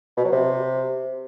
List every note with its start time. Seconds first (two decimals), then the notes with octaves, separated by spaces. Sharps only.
0.17 B2
0.24 F#3
0.32 C3